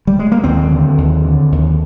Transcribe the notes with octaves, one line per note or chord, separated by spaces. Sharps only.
G3
G#3
A#3
D#2 C4
D3
D#2
D3
D#2